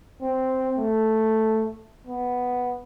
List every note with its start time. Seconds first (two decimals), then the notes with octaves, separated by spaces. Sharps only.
0.22 C4
0.78 A3
2.07 B3